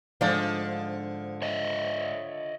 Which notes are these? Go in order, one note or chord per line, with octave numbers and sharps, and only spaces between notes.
G#2 D3 F3 D5 F5
C#5 D#5 E5